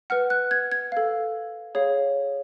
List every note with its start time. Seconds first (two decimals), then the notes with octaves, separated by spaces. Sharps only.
0.10 B4 F#5 F6
0.30 F#6
0.51 G#6
0.72 G#6
0.92 A4 F5
1.75 G#4 C#5 F5